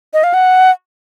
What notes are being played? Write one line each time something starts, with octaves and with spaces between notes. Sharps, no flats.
D#5
F5
F#5